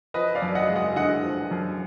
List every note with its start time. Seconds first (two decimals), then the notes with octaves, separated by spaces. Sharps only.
0.14 F3 B4 D#5
0.35 D5 F5
0.42 F#2
0.55 D#5 F#5
0.70 G#3
0.76 D#5 F#5
0.96 D3 D#5 F#5
1.23 F3
1.51 F#2